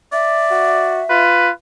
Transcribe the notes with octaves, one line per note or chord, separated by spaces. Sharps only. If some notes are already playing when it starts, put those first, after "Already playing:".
D5 E5
F#4
F4 B4